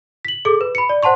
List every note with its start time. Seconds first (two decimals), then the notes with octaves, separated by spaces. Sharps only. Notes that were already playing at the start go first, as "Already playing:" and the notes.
0.25 B6 F#7
0.45 G#4 A4 D6
0.61 B4
0.75 B5 C#7
0.89 D5
1.03 C5 F#5 A5 C6 C#6